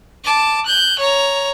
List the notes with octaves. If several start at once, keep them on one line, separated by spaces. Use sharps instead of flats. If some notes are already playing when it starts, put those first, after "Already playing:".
A5 D6
F#6 G6
C#5 A#5